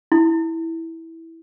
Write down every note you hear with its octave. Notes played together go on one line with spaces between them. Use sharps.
E4